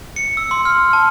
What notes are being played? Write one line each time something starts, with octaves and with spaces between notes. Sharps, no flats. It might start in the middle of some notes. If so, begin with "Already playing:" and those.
C#7
E6
C6
F6
A5